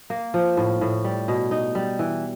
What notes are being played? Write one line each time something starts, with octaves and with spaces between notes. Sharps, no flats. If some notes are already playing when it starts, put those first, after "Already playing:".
A#3
F3
A2
A2
G3
B2
D#4
G3
E3